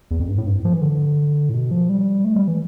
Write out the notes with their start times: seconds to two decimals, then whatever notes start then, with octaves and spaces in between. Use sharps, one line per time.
0.11 E2
0.20 F2
0.29 G2
0.38 A2
0.47 G2
0.65 F3
0.73 E3
0.82 D3
1.49 A2
1.54 B2
1.71 F3
1.89 G3
2.25 A3
2.36 G3
2.48 E3